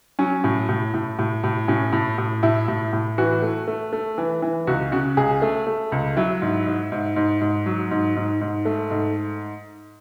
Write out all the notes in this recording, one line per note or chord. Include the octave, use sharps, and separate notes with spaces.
F#3 C#4
A2
A2
A2
A2
A2
A2 C#4
A2
A2
A2 E4
A2
A2
E3 F#4
A3
A3
A3
E3
E3
C#2 F#4
C#3 F#4
C#2 G#4
A3
A3
C#2
F#3 E4
G#2
G#2
G#2
G#2
G#2
F#3
G#2
G#2
G#2
A3
G#2